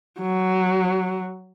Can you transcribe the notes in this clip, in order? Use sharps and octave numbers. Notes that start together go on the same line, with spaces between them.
F#3